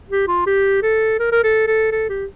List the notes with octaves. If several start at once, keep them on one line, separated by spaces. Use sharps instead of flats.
G4
F4
G4
A4
A#4
A#4
A4
A4
A4
G4